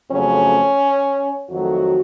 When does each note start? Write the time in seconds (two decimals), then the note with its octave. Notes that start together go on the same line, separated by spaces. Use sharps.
0.10 F2 C#3 F#3 A3 C#4
1.49 F2 D#3 F#3 A3 F#4